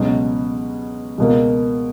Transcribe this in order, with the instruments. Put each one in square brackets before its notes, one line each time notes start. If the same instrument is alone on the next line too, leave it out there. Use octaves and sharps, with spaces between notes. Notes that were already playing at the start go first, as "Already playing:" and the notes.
Already playing: [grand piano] C#2 B2 F#3 C#4
C#2 B2 A#3